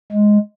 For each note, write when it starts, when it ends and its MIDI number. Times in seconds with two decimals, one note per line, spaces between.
0.12 0.38 56